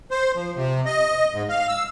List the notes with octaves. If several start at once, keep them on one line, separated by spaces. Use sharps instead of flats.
C5
F3
C3
D#5
G#2
F5
E6